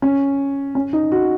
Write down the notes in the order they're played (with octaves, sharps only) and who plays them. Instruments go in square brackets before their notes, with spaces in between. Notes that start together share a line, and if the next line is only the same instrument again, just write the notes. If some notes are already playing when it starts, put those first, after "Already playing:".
[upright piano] C#4
C#4
D#4
F#4